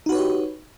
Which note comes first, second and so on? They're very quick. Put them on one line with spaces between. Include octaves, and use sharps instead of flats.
D#4 F#4 B4 C#5 G4